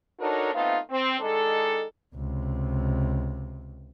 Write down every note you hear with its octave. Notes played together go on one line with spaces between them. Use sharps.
D4 D#4 F#4 A4 A#4 C#5
A3 B3 C4 D#4 F4
C4
D#3 G#3 D4 A4
C#2 C3